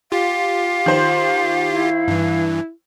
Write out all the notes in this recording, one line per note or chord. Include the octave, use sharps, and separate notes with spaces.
F4 G4 F5
D#3 C5
E4
G2 E3